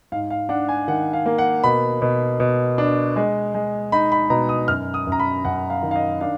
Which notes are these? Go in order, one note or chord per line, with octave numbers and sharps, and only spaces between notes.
G#2 F5
F5
D4 F#5
G#5
D#3 F#5
F5
A#3
F#5
B2 B5
B2
B2
D4
G#3
G#3
D#4 B5
B5
B2 A#5
D#6
F#2 F6
D#6
F#2 A#5
B5
F#2 F#5
F5
D#3
F5
D#5
D4 F5